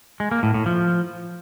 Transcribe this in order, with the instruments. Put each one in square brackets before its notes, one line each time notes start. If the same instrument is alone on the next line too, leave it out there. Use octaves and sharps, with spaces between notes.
[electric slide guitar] G#3
A#3
A2
A2
F3